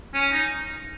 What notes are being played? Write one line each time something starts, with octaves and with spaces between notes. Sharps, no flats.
C#4
D#4